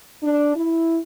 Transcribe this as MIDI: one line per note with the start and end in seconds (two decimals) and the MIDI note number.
0.23 0.54 62
0.56 0.98 64